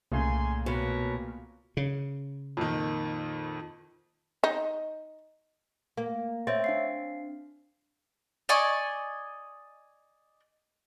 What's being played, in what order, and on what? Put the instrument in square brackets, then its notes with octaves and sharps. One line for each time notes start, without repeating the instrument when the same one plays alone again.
[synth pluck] C2 [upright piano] A#2 C#3 A3 [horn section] G#5 A#5 C6
[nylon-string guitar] B2 [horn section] A#4 B4 C#5
[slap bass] C#3
[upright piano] F2 A#2 D#3
[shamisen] D#4
[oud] A#3
[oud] C4 [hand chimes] C#5 E5 A6
[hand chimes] D4 F5 C7
[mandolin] D5 D#5 G#5 C#6